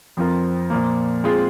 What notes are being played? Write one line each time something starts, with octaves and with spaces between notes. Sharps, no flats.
F2 F3 C4 F4 A#4
A#2 F3 A#3
G#3 C4 F4 G#4